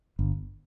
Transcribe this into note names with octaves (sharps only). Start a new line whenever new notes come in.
G1